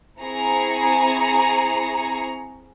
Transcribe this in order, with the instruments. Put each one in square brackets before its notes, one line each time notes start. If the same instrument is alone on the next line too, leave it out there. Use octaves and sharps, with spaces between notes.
[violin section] C4 E4 G#4 A#5 C#6